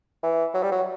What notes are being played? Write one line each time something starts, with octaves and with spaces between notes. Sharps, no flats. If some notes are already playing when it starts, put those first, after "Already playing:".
E3
F#3
G3
F#3